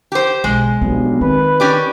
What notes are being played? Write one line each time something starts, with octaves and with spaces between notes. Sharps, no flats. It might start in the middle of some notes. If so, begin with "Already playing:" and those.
G4 C5
B1 G#3
B1 G2 F3 B3
D#3 C4 B4
C#4 G4 D5